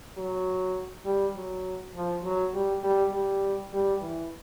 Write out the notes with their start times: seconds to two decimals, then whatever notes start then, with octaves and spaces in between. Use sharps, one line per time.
0.17 F#3
1.05 G3
1.35 F#3
1.95 F3
2.24 F#3
2.54 G3
2.83 G3
3.13 G3
3.73 G3
4.01 E3